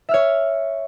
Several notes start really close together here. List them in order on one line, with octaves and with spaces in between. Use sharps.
E5 F6 C#5